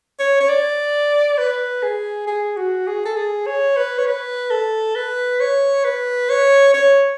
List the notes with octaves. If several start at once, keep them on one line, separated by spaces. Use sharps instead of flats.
C#5
C#5
D5
B4
G#4
G#4
F#4
G#4
A4
G#4
C#5
B4
C#5
B4
A4
B4
C#5
B4
C#5
C#5